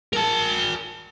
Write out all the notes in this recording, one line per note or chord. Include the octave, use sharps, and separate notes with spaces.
A#4 A5